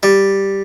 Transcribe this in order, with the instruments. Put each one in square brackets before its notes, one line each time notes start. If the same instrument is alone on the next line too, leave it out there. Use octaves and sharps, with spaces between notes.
[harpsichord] G3